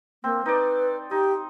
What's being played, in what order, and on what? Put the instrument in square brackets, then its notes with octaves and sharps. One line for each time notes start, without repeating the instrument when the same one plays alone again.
[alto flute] A#3 [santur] C4
[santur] D#4 D5 [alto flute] B4
[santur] D#4 [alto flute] G4